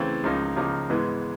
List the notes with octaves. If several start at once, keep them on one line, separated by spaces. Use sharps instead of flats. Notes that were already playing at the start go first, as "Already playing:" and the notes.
Already playing: C#3 E3 A3 C4
C#2 C#3 F3 A#3 D#4
C#2 C#3 F3 A#3 D#4
G#2 E3 G#3 B3